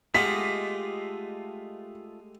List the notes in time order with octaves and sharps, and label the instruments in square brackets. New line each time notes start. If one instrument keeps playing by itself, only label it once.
[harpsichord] G#3 F5 F#5 [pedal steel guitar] A3 F4 D#5 [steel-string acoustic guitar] G4 [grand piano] B6